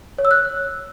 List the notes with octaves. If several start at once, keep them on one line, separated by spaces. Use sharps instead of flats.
C#5
E6
F#6